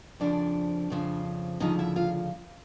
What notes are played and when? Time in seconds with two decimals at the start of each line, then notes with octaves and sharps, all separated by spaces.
0.20 F2 C#3 F3 D4 D5
0.90 F2 C#3 F3
1.60 D2 C#3 F3 D#4 D#5
1.79 E4 E5
1.96 F4 F5